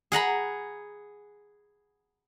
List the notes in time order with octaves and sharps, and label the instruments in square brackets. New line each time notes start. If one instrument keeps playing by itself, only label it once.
[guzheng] G#4 F#5 A#5 B5